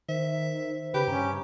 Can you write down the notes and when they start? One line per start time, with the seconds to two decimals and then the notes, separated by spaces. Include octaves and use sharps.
0.09 D#3 C5 E5
0.94 C#3 G4 B4
1.08 G2 C#4 A#5